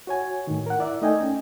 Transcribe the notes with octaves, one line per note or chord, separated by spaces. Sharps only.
F#4 C#5 G#5
A2 D#3
A#4 F#5
E4 D5 E5
A3 D#4 D#5 G5 G#5
C#4